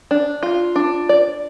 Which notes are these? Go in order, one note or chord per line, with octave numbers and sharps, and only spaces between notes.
D4
F4
D4
D5